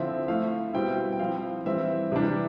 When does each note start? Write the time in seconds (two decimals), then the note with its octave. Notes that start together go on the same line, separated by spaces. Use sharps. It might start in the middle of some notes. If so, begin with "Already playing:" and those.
Already playing: D3 F3 C4 E4 E5
0.28 F3 A3 E4 F5
0.73 B2 G3 C4 E4 G5
1.12 G5
1.19 F3 C4 E4 F5
1.65 E3 G3 C4 E5
2.12 C3 E3 G3 D4